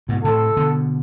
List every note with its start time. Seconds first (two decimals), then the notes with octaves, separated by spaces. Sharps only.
0.09 G#2 B2
0.24 A2 C3 A4
0.57 B2 D3